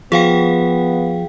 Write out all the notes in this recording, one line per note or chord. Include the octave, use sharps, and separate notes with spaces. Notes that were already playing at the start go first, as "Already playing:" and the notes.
F3 B3 G#4 F5 G5